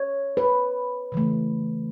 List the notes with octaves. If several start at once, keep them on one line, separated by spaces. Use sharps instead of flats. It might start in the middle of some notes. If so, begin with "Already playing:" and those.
Already playing: C#5
B4
C#3 E3 A3